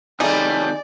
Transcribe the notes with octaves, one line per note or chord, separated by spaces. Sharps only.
C3 D#3 G3 A3 C#4 D#4 G#4 D5